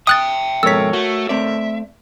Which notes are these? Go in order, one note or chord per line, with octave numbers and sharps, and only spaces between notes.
E5 G5 D#6 F#6 A6
F2 G#2 B2 A4 A#4 C#5 E6 B6
A3 F#4
A3 C4 D5 E5